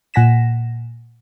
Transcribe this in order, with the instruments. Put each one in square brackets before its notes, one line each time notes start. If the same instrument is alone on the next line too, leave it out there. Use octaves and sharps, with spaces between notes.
[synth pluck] A#2 F#5 G#5 A#6 B6 E7